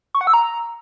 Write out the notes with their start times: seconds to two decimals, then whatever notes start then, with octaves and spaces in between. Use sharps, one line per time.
0.15 C#6
0.21 F#5
0.27 E6
0.34 A#5